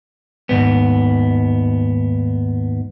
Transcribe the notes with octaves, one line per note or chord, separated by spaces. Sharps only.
D#2 G#2 B3